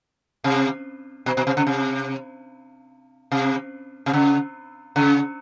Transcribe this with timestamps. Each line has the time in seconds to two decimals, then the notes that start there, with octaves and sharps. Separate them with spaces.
0.44 C3
1.26 B2
1.37 B2
1.47 C3
1.57 C#3
1.67 C3
3.31 C3
4.06 C3
4.13 C#3
4.96 C#3